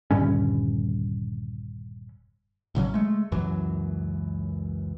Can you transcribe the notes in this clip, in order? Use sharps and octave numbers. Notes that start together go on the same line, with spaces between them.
D#1 G2 D3 C#4
A1 C#3 F#3 C#4
G#3 A3
C#2 F#2 E3 F#3